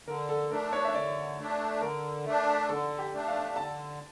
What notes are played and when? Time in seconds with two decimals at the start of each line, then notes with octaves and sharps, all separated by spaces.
0.07 D3 A#4
0.29 A4
0.51 A3 D4 A#4
0.73 C#5
0.85 E5
0.95 D3 D5
1.38 A3 D4
1.81 D3 A#4
2.25 A3 D4
2.69 D3 A4
2.99 G4
3.13 A3 D4
3.27 F5
3.56 D3 A5